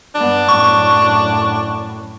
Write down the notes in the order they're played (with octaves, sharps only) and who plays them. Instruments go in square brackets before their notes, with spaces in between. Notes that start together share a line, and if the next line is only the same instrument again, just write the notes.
[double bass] G2 B3 [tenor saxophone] D4
[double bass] F#2 A2 [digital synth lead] C#6